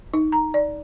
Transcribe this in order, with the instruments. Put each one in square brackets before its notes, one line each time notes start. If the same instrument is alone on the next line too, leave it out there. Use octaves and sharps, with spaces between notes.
[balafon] D#4
A#5
D5